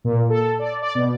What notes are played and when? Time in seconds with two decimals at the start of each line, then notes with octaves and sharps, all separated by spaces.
0.04 A#2
0.30 A4
0.59 D5
0.83 D5
0.95 B2